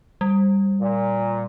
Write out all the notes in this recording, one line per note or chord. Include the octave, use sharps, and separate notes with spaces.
G3
A#2